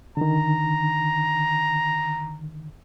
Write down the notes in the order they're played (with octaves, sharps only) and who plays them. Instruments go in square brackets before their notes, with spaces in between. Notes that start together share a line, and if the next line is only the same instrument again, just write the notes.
[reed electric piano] D3 D#3 [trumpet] A#5